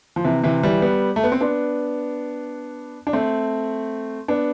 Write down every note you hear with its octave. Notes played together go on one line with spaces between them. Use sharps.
F3
C3 E3
C3 E3
E3 G3
G3 B3
A3
B3
C4
B3 D4
D4
A3 C4
B3 D4